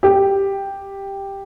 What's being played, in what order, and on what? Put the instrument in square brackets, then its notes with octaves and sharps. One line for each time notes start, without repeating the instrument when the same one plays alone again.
[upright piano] G4